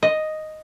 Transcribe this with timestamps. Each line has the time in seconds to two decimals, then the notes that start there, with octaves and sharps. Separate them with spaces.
0.03 D#5